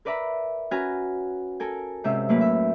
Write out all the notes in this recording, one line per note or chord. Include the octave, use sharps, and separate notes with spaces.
A#4 B4 D5 E5 A#5 B5
C#4 F#4 B4 G#5 A#5 F6
A4 A#4 G#5
G#2 C3 C#4 E5
F#2 A2 A#3 B4
E5